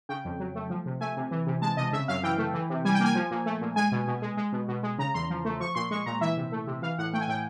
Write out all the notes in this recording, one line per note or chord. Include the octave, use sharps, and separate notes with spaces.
C#3 G5
F2
F#3
A3
F3
C3
A3 G#5
C3
E3
C3
G#3 A5
C3 D#5
C#3 E5
F#2 F5
E3 G5
A3
E3
C3
G3 G#5
G5
A#3 G#5
F3
A#2
A3
A#2
G#3 G#5
B2
B2
G#3
G#3
B2
B2
G#3
C#3 A#5
E2 C6
F3
A3
F3 C#6
A#2 C6
G#3 C#6
A#2 A#5
E3 E5
C3
A3
C3
E3 F5
A2 F#5
A3 G5
G#5
A2 G5